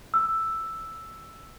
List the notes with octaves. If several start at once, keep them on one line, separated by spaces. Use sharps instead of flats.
E6